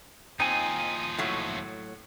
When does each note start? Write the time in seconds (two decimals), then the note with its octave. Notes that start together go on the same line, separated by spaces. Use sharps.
0.40 D#2 F3 C4 D#4 G#5
1.19 A2 F#3